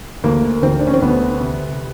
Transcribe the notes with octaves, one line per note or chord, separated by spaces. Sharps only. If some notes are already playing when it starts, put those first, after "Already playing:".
D2 A#3
D2 C4
D4
C#4
C4
D2 B3
C3